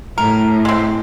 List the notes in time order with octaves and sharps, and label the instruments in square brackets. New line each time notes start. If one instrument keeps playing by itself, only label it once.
[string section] A2 [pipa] A#4
[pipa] G#3 C4